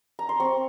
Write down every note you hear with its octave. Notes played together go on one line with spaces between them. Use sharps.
A#5
C6
C4 C#6